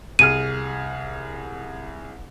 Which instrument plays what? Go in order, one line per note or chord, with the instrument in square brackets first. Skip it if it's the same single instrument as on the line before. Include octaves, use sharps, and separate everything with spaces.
[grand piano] C2 G#4 F6 [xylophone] D#7